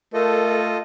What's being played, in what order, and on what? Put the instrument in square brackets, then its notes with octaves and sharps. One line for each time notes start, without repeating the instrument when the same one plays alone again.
[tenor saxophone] A3 [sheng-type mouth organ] F4 A4 D#5 [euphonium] A#4